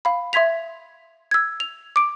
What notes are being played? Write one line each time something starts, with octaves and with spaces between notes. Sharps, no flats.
F5 B5
E5 C6 G#6 B6 F7
E6 G#6
F7
D6 D7